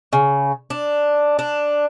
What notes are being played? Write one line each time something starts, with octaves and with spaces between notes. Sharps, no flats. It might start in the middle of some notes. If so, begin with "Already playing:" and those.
C#3
D4
D4